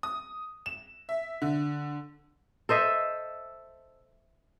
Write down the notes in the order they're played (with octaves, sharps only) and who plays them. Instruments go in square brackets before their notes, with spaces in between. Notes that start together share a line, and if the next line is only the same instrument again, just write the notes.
[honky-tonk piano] D#6
E7
E5
D3
[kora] A4 C5 D#5 E5